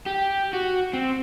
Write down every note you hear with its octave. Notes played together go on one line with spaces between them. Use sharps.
G4
F#4
C4